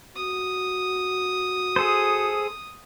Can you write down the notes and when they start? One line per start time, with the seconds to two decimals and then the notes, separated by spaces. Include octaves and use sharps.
0.16 F#4 D#6
1.76 G#4 A4 C5